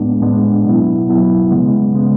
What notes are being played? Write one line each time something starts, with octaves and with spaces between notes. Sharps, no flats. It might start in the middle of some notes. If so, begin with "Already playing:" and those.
Already playing: A2 G#3 B3 D4
A2 G#3 B3 D4
B2 F#3 B3 E4
B2 F#3 B3 E4
C#3 G#3 B3
C#3 G#3 B3